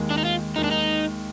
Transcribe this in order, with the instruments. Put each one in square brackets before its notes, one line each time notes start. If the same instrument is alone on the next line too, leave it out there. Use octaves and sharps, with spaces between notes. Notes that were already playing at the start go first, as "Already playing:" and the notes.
Already playing: [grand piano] D#2 D#3 G#3
[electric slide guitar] D4
D#4
F4
[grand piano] D#2 D#3 G#3 [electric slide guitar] D#4
[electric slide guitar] D4
D#4